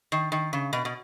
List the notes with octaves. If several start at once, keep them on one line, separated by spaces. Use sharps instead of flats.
D#3
D#3
C#3
B2
B2